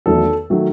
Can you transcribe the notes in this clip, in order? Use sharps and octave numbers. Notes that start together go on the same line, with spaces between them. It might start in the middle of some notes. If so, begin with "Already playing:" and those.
E2 D#3 F#3 A3 A4
D#3 F#3 A3